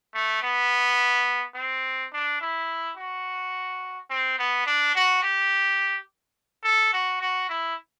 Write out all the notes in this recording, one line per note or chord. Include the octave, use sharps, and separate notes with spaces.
A3
B3
C4
D4
E4
F#4
C4
B3
D4
F#4
G4
A4
F#4
F#4
E4